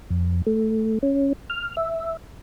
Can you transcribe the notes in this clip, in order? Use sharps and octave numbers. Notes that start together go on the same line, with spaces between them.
F2
A3
C#4
F6
E5